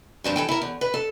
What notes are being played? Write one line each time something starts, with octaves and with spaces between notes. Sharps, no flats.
G2 F3 C4 D4
E3 A4 G5
E4 A#4
E2
B4
A4